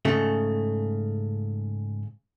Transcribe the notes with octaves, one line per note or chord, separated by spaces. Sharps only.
G#2 C#3 A3